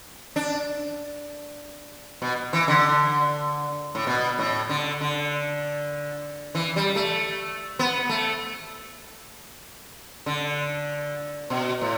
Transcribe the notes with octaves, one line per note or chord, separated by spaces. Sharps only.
D4
B2
E3
D3
A2
B2
A2
D3
D3
E3
G3
A3
B3
A3
D3
B2
A2